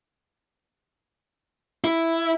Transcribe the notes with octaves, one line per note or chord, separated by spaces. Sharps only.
E4